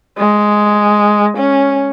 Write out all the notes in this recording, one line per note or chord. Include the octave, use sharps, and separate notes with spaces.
G#3
C#4